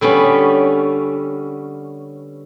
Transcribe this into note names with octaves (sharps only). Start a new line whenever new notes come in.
D3 G3 B3 C#4